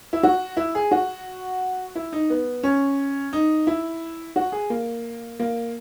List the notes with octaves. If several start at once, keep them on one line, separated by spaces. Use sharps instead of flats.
E4
F#4
E4
G#4
F#4
E4
D#4
B3
C#4
D#4
E4
F#4
G#4
A#3
A#3